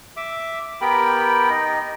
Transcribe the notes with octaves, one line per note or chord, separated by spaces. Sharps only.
E5 D6
B3 G4 A#4 G5 B5
D#4 D#5